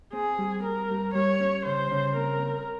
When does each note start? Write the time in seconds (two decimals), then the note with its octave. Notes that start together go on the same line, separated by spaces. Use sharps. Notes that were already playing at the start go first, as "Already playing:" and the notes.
0.13 C4 G#4
0.38 G3
0.63 C4 A#4
0.90 G2
1.14 G3 C#5
1.40 C#4
1.65 C#3 C5
1.91 C#3
2.16 C4 A#4
2.42 C4